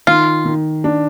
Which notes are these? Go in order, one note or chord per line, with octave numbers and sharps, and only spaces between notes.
D#3 F4
D#3
D4